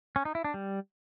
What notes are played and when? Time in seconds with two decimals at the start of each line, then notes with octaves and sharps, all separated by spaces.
0.16 C#4
0.25 D#4
0.35 E4
0.44 D4
0.54 G3